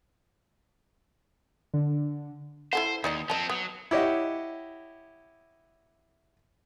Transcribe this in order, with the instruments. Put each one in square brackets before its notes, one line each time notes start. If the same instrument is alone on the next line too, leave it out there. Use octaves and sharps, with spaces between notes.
[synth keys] D3
[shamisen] E4 A4 F#5 [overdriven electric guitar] C5
[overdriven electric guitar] D#2 [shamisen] D#4 D5 D#5
[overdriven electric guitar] F3 C4 [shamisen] D#5 A5
[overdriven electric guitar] F#3 [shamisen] B3
[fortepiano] E4 G4 C#5 D#5 F#5